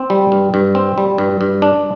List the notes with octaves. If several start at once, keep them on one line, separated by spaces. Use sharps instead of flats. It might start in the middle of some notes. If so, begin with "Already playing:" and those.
Already playing: C4
G3
G2
G2
C4
G3
G2
G2
D4